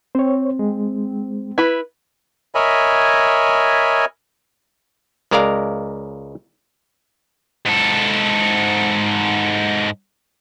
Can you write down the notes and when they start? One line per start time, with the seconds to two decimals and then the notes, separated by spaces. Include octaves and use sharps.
0.15 C4 C5 C#5
0.59 G#3
1.58 E4 B4
2.55 A#4 C#5 D#5 E5 G#5 B5
5.31 C#2 G#3 A#4 D5 F5 A#5
7.66 G#2 A4